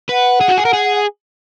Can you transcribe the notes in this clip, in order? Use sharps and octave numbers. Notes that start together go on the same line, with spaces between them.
B4 F#5
G#4
F#4
G#4
A#4
G#4